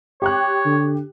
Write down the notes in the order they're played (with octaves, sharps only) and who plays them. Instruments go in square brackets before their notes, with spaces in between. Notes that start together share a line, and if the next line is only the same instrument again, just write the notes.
[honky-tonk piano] G4 G5 F#6 [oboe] C#5
[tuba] D3